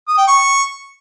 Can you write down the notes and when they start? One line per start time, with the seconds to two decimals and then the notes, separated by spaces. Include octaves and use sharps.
0.08 D#6
0.18 G5
0.28 C#6